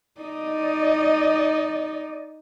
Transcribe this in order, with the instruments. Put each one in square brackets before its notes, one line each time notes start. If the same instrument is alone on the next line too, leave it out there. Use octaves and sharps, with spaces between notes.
[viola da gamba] D#4 [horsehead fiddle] D5 D#5